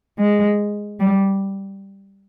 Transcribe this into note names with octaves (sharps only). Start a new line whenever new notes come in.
G#3
G3